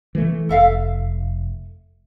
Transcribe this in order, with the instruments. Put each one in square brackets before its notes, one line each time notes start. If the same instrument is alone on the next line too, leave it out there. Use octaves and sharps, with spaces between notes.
[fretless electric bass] E3 G3 A3
[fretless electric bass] F1 [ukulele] A4 E5 F5